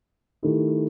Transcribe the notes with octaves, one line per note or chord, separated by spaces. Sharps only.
D#3 A3 E4 G4